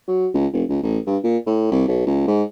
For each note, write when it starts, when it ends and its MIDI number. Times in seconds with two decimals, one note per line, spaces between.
0.08 0.28 54
0.34 0.47 37
0.53 0.64 29
0.69 0.81 37
0.83 0.98 33
1.07 1.17 43
1.24 1.37 46
1.46 1.70 45
1.72 1.87 36
1.88 2.02 35
2.07 2.26 37
2.27 2.43 44